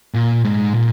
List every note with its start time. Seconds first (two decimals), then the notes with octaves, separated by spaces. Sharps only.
0.14 A#2
0.44 G#2
0.73 A#2